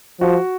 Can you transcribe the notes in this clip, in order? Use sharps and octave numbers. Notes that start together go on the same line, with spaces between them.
F3 F#4